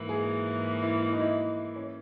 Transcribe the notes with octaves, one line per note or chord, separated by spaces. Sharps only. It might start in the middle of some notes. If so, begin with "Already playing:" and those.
Already playing: G#2 E3 A#3
G#4
E4
E4
D#4
E4
C#4